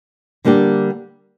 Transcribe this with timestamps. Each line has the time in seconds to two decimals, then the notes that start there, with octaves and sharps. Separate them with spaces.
0.45 D3 G3 A#3 D4 G4